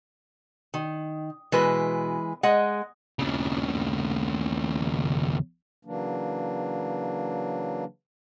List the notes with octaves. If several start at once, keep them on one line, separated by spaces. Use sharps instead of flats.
D#3
B2 E3 G#3 B4
G#3 D#5 F#5
D#2 C#3
C#3 E3 F#3 A#3 D4